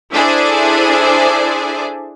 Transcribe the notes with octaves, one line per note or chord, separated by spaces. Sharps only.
D4 E4 G#4 A4 C5 D5